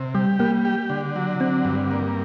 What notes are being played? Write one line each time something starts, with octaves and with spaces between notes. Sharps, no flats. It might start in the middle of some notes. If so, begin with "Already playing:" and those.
Already playing: C3
G3 G4
G3 A#3
G4
D3
F#3
D3 C4
G2
A#3